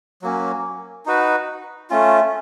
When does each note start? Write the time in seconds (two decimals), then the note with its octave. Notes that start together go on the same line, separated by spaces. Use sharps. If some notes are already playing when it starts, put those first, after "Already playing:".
0.22 F#3 A#3 C#4
1.06 D#4 F#4 B4
1.90 A3 C#4 F4